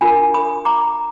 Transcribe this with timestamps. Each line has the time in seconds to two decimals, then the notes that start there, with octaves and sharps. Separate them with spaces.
0.01 D4 F4 A#4 G#5 B5
0.34 B5 D#6
0.65 A#5 D6